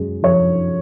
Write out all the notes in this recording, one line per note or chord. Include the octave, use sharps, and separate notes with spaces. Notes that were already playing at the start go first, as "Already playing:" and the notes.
Already playing: F#2 G#3
F3 C#5